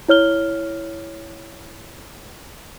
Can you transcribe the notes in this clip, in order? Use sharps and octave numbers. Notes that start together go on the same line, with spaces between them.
E4 C#5 F6 G7